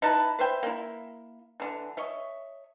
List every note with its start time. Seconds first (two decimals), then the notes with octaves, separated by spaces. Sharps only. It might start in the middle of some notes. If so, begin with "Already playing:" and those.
0.02 D#4 E4 B4 A5
0.39 B4 C5 E5 G5
0.63 A#3 E4
1.60 D3 E3
1.97 C#5 D#5 E5